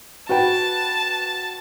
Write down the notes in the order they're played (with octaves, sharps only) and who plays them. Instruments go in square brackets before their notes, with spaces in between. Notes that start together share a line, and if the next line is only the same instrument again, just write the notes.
[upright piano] F#4 B4 G5 [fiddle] A5